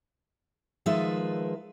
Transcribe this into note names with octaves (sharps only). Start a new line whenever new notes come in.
D#3 F3 G#3 B4 E5